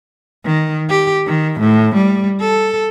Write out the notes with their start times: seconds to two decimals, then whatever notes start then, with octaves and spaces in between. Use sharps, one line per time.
0.45 D#3
0.90 G4
1.27 D#3
1.60 A2
1.95 G3
2.40 A4